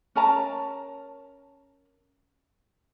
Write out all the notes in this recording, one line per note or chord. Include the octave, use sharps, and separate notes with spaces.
C#4 A#4 A5 A#5